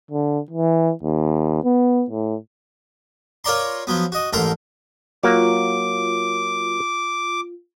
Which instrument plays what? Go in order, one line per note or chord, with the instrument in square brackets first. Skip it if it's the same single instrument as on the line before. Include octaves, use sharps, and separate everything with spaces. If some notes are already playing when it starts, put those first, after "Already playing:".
[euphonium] D3
E3
D#2
B3
A2
[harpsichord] F4 A#4 C#5 D5 A#5 C6
F3 F#3 B3
F#4 D#5
A1 G#2 A4 A#4 A#5 C6
[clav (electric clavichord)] F#3 A#3 [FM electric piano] F4 [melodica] D6